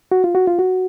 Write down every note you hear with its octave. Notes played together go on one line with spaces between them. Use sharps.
F#4
F4
F#4
F4
F#4